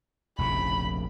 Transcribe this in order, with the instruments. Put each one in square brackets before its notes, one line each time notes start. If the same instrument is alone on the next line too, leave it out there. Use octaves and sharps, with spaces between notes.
[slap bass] F1 A#1 C#3 [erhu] B5